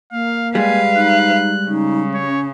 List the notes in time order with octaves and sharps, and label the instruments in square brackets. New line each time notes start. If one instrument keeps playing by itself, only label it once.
[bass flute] A#3 [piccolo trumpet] F5
[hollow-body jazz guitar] G3 G#3 [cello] B4 F5 [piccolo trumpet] G#5
[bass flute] D#4 [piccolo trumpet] F#6
[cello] C#3 [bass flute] D#4
[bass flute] C#4 [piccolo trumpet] C#5